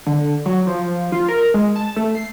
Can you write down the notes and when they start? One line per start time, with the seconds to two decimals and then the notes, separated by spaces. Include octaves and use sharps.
0.07 D3
0.46 F#3
0.67 F3
1.12 F4
1.28 A#4
1.54 G#3
1.76 A5
1.96 A3
2.15 C7